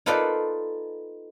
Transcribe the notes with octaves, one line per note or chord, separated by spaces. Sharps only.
D#4 F4 A4 B4 C5 D5